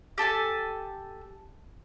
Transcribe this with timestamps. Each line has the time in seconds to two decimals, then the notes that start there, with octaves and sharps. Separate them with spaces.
0.18 G4 A4 G#5 A5